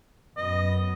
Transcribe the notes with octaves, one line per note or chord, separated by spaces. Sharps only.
F#2 B3 D#5